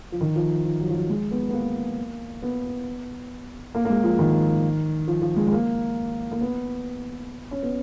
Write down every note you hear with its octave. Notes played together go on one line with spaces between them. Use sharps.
F3
D#3
F3
F3
F#3
F3
F#3
G#3
B3
B3
A#3
B3
A#3
A#3
G#3
F3
D#3
F3
F3
G#3
G#3
A#3
A#3
B3
C#4
B3